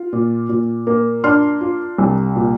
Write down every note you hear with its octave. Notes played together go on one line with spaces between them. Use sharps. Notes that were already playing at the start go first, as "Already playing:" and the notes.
Already playing: F4
A#2
A#2
A#3
D4 C6 F6
F4
C2
A#2